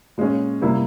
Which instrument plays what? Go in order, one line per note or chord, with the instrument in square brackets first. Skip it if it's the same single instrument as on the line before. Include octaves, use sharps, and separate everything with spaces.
[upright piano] A#2 G#3 C#4
C3 G3 A#3 E4